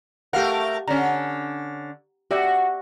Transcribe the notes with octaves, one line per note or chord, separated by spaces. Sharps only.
A3 G4 A#4 F5 F#5
D3 C#4 A#5
F#4 G4 D5 E5